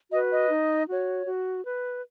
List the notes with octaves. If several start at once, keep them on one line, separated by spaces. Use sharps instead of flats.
F#4 B4 D#5
D#5
D#4
F#4 C#5
F#4
B4